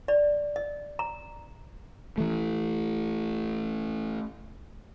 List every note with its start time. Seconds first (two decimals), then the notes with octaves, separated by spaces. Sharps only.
0.08 D5
0.56 D#5
0.99 A#5
2.18 E3 A3